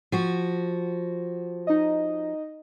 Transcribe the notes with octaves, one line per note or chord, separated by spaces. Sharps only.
F3 F#4
D#4 D#5